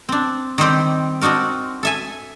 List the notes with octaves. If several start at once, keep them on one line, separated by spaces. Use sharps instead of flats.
C4 D4
D#3 G3 C4 G4
C4 D4 D#4 F#4 A#4
A4 E5 G#5